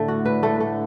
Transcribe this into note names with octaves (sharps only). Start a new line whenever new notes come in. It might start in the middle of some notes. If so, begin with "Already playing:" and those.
Already playing: A2 D3 A3
F#4
B4
A3
A3